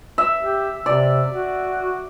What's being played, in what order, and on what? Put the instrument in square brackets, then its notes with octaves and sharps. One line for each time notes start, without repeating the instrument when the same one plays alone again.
[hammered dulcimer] E5
[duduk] G4
[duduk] C3 [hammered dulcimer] D5
[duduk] F#4